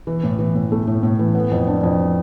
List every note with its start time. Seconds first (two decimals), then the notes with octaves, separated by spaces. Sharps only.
0.07 E3
0.24 A2
0.39 E3
0.55 A2
0.72 A3
0.87 A2
1.03 A2
1.19 E3
1.35 B3
1.51 F2
1.67 D4
1.83 F2